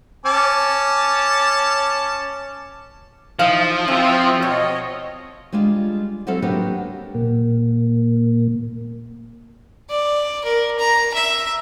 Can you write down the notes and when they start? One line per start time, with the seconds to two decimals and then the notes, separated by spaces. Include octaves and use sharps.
0.26 C#4 A5 D6
3.39 E3 F3 D#4 F5
3.88 C4 E4 F4 E5
4.42 B2 C#5 D#5
5.53 G3 G#3 D4 F4 D5
6.27 F#3 G3 C4 A4 E5 F5
6.42 F#3 G3 A#3 B3 D4 G4
7.15 A#2 A#3
9.90 D5
10.44 A#4
10.79 A#5
11.14 E5